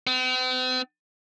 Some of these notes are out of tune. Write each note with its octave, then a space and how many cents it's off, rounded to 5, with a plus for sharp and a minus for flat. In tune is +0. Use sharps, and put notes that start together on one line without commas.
C4 -45